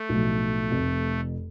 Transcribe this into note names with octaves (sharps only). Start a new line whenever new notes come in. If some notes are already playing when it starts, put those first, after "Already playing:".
Already playing: A3
B1 A2 F3
F1 F2 C3